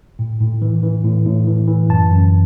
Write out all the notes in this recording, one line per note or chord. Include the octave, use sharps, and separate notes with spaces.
A2
A2
E3
E3
A2
A2
E3
E3
F#2 A5
F#2